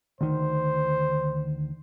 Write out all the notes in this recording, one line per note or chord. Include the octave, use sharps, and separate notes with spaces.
D2 D#3 C5